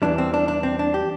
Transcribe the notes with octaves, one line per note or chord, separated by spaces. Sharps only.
E2 E3 G3 D4
C4
D4
D4
C4
D4
G4